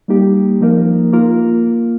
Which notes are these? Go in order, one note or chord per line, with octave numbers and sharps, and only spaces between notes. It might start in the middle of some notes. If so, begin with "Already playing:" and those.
G3 A#3 D#4 G4
F3 A#3 D#4 A#4
A#3 F4 A#4